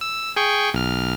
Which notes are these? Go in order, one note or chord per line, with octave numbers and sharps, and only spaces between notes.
E6
G#4 G5 C#6
B1 F6